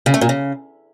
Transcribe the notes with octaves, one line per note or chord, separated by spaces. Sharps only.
C#3
A3
A#2
C#3